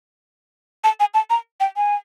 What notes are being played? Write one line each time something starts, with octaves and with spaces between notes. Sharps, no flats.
A5
G#5
A5
A#5
G5
G#5